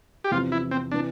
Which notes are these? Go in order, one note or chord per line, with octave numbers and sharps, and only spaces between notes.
G4
E2 C3 F3 F4
E4
C4
C3 E3 D4